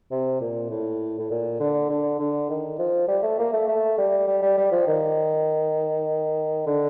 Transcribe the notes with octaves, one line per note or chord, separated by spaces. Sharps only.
C3
A#2
A2
A2
A#2
D3
D3
D3
D#3
F3
G3
A3
A#3
A3
A3
G3
G3
G3
G3
F3
D#3
D3